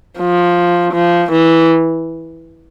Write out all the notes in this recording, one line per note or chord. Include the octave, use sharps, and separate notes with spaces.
F3
F3
E3